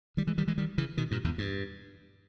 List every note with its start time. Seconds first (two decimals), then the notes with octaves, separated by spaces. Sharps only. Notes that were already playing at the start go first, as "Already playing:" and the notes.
0.17 D#3 G3
0.27 E3 G#3
0.38 D#3 G3
0.48 E3 G#3
0.58 D#3 G3
0.78 C#3 E3
0.97 B2 D#3
1.11 G2 A#2
1.24 E2 G#2
1.38 G2